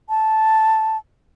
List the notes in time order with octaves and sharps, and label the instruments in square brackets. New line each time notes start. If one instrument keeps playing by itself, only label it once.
[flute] A5